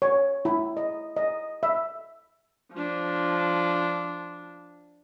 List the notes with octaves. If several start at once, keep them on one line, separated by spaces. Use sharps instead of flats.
C#5
E4
D#5
D#5
E5
F3 D4